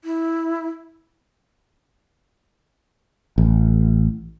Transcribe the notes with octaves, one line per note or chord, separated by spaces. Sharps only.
E4
A1